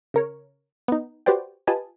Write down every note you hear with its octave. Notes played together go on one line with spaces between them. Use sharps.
C#3 A#4 C#5
B3 D#4
F#4 G4 B4 C5 D5 G5
F4 G4 B4 D#5 G#5 A5